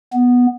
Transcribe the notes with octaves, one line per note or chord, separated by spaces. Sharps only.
B3